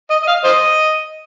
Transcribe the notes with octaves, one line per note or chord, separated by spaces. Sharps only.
D#5
D#5
F5
C5 D#5